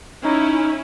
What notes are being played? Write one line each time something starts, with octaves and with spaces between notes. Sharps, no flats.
C#4 D#4 E4